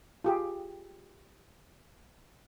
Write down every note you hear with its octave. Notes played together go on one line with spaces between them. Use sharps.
F4 G4 G#4